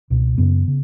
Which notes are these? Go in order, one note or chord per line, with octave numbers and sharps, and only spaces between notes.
C#2 B2
F#2 C#3 B3
C#3